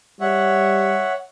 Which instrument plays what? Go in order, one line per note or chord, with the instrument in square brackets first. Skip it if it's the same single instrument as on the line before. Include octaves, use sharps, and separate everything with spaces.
[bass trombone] G3 [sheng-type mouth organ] C#5 E5 F#5